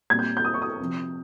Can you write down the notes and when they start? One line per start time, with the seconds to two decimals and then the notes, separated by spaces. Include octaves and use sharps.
0.10 A#2 G3 C4 G#6
0.19 G6
0.37 G6
0.45 D#6
0.54 C#6
0.62 D#6
0.80 C3 F3 C4